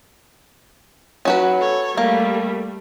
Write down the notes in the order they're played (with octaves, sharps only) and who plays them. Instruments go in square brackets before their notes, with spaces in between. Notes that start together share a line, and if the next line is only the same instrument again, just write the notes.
[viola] F#3 [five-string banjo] C#4 F#4 B4
[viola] A4 C#5
[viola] G3 A3 [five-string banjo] A#3